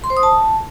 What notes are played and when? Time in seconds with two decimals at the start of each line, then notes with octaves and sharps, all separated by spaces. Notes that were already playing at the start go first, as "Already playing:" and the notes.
0.04 C6
0.10 C5
0.17 D#6
0.23 A5